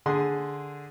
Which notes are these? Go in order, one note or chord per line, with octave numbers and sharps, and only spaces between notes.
D3 G#4 C6